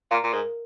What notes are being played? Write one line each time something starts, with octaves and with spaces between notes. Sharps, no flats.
A#2 F5 A#5 D6 F6
A#2
G#2 A#4